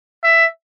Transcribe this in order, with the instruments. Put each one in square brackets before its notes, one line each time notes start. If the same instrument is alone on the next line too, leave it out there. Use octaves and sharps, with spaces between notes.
[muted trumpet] E5